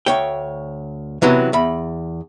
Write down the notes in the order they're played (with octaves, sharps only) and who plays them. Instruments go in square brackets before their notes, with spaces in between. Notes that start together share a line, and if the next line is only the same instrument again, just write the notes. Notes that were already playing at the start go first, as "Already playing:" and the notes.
[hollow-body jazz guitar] D2 C#5 G5
C3 E3 F#3 B3
E2 B5